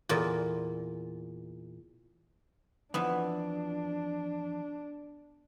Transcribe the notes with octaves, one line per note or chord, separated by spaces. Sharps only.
E2 A#2
F2 E3 F3 B3 D4 E5